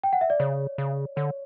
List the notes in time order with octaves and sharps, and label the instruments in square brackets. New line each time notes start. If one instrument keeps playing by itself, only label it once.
[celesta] G5
F#5
E5
D5
[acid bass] C#3 [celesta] C#5
[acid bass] C#3
[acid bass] D3 [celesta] C#5